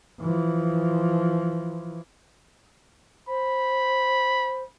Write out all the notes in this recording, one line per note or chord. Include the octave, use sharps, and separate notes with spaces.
E3 F3
C5 B5